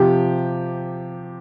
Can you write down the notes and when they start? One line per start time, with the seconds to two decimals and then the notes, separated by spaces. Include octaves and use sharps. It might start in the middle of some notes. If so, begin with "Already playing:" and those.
Already playing: C3 F3 G4